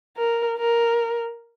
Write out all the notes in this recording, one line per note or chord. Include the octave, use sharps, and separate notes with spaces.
A#4
A#4